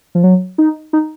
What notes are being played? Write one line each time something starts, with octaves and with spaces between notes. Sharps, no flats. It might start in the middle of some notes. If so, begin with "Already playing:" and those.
F3
F#3
D#4
D#4